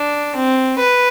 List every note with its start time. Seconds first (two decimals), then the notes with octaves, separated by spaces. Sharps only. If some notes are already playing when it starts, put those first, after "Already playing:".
Already playing: D4
0.36 C4
0.79 B4